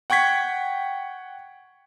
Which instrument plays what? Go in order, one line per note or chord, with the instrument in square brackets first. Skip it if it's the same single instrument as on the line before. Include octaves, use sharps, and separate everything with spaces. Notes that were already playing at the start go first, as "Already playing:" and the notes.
[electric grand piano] F#5 G5 C#6 G#6 B6